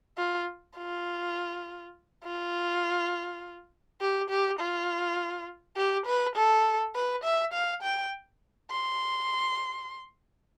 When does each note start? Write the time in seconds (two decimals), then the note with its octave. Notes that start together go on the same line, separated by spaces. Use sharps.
0.18 F4
0.77 F4
2.24 F4
4.01 G4
4.30 G4
4.60 F4
5.77 G4
6.06 B4
6.36 A4
6.95 B4
7.24 E5
7.54 F5
7.83 G5
8.71 C6